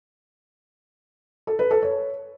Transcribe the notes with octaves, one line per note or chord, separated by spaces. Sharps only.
A4
B4
A4
C#5